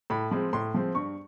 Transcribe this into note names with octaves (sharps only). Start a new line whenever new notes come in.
A2 B5
F3 G#3 C4
A2 C6
F3 G#3 C4
G2 C#6